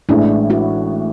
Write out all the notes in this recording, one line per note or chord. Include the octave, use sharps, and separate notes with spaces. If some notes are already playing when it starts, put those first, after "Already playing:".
A1 A2 E3 G#3 D4 E4
E4 F#4